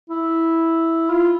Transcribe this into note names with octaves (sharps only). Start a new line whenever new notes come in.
E4
F4